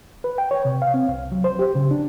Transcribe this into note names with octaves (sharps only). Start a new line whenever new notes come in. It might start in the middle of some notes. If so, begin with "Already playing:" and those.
B4
G5
C#5
C3
F5
C4
C2
F#3
C5
G4
C#3
D4